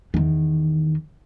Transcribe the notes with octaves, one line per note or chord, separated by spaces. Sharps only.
E2 D#3